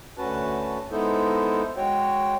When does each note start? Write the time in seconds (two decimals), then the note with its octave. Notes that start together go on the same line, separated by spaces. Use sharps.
0.18 D2 C#4 F#4 B4 A5
0.91 G#3 B3 D#4 E4 A4 C5
1.77 G#3 F#4 C#5 G5